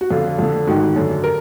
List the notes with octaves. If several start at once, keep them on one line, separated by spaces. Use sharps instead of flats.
F#4
F2 D3 F4
F2 D3
G#2 D#3 F#4
F#2 D3
A#4